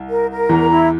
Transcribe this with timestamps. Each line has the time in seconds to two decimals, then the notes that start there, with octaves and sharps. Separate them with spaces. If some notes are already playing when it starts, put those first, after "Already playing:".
Already playing: C2
0.09 A#4
0.29 A#4
0.49 E2 E3 A#5
0.70 E4